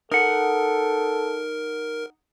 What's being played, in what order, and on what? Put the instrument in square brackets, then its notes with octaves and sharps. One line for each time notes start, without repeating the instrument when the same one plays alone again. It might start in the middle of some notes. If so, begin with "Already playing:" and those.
[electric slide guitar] D#4 F#5 [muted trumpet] A4 [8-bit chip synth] A#4